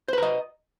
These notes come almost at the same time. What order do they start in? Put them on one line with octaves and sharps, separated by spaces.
C5 B4 A#5 D#5